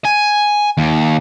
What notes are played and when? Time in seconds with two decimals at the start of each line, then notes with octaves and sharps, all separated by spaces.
0.05 G#5
0.78 D#2